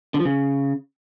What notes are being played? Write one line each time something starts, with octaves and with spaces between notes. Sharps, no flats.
D3
F3
C#3